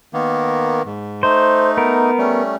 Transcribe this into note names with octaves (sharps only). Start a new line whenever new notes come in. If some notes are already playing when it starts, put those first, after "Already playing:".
D#3 A#3 B3
G#2
A3 D#4 C5
B3 A#4
G3 A3 C#4